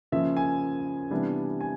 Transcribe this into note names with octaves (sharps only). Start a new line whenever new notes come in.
C#3 F3 A#3 E5
G#5
C3 E3 G3 B3 D4
G#5